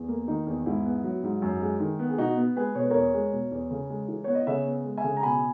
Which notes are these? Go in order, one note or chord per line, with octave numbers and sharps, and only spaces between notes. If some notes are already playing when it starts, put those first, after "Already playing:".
Already playing: E2
A#3
D#3 D#4
E2
G#2 E4
B3
F#3
G#2
F#2
G#3
D#3
B3
G#4
B2 D#4 F#4
B3
G#3 G#4 B4
B2 C#5
B4
E2 A#4 C#5
G#3
B2
E2
C#3
G#3
E3
B3 C#5
D#5
C#3 C#5 E5
B3
G#3
E5 G#5
C#3
A#5
B2 G#5 B5